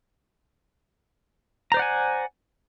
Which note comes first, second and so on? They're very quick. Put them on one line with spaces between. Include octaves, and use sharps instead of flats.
A#5 C5 D5 F#5 G#5